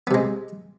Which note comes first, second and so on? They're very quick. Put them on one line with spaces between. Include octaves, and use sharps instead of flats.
B3 C3 G#3